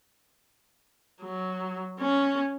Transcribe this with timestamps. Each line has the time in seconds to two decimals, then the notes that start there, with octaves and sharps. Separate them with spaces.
1.22 F#3
2.00 C#4